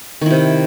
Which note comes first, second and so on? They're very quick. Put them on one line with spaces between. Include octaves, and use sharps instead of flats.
D#3 E4 C3